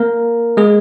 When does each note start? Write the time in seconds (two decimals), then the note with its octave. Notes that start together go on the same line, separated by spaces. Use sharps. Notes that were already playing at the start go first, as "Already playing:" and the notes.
Already playing: A#3 A#4
0.57 G#3 G#4